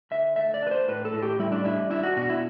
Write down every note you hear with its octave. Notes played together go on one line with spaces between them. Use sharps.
D3 E5
A3 E5
D5
D4 B4
C5
A2 B4
A4
A2
G4
G3 E4
D4
D4 E4
D4 E4
F#4
B2 F#4
E4